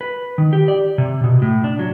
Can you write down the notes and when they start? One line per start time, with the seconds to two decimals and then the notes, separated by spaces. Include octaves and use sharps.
0.01 B4
0.38 D#3
0.53 G4
0.68 D5
0.98 C3
1.24 B2
1.42 A2
1.64 D4
1.79 F#3